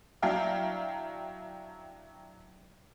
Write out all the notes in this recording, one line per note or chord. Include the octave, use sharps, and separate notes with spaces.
F#3 D4 E4 F5 G5 A#5